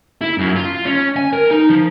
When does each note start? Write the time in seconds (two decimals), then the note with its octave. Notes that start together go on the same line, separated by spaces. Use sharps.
0.21 E4
0.38 F#2
0.55 F4
0.85 C#4
1.16 G#5
1.33 A#4
1.51 D#4
1.70 F3